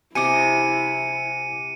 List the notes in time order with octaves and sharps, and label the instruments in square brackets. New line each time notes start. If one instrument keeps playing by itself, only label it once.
[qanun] C3 D#5 [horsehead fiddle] E4 [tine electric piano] G#5 D6 [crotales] C#7 D#7